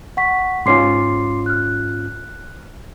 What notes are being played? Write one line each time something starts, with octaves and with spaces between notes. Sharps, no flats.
F#5 C#6 B6
G#2 C#4 F4 C6 D6 C7
F6 F#6